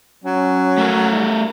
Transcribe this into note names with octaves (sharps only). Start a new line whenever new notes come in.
F#3 C#4
A3 A#4
G3 D4 E4